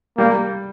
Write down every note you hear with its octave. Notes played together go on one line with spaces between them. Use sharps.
G3 A#3